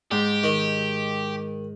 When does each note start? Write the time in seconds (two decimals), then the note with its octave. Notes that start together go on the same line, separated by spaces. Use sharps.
0.11 G#2 G4
0.43 D#3